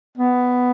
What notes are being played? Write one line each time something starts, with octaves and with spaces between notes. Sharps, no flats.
B3